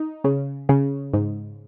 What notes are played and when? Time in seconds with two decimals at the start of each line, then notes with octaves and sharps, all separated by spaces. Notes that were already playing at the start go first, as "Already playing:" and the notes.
Already playing: D#4
0.24 C#3
0.69 C#3
1.13 G#2